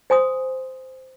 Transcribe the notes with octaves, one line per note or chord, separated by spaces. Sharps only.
C5 G#5 C6 D#6